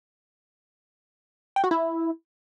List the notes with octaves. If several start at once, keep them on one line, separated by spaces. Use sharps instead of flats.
G5
F#4
E4